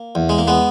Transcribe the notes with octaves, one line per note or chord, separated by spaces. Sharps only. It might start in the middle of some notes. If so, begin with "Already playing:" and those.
Already playing: A#3
E2
G#3
A#3
G#3 B3